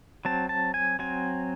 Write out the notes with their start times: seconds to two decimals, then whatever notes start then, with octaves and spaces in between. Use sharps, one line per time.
0.25 F#3 C4 A5
0.49 A5
0.74 G#5
0.99 F#3 C4 G#5